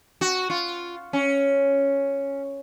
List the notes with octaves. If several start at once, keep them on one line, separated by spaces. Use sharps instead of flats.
F#4
F4
C#4